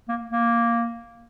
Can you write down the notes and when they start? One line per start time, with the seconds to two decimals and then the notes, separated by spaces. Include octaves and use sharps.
0.09 A#3
0.29 A#3